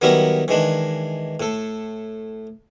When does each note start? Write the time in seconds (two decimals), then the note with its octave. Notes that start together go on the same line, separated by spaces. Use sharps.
0.01 D#3 F#3 G3 B3 E4 A#4
0.48 D#3 E3 G#3 D4
1.40 A2 A4